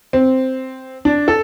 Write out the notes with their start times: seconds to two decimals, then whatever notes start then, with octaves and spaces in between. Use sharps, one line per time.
0.13 C4
1.05 D4
1.28 A4